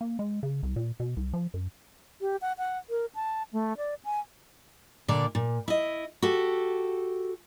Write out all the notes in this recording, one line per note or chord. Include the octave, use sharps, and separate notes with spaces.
A#3
G#3
C#3
C2
A#2
B2
C2
F3
F#2
G4
F#5
F#5
A#4
A5
A3
D5
G#5
A#2 D3 D5
A#2
E4 D#5
F#4 G4 A4